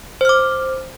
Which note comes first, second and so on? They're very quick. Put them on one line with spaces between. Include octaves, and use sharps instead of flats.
C5 F6 D6